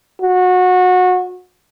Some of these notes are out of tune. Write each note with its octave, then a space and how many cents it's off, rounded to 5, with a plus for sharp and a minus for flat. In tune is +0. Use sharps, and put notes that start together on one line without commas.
F#4 -25